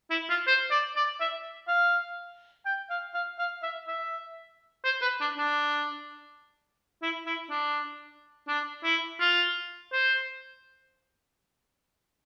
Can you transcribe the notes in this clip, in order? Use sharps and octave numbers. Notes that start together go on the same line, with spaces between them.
E4
F4
C5
D5
D5
E5
F5
G5
F5
F5
F5
E5
E5
C5
B4
D4
D4
E4
E4
D4
D4
E4
F4
C5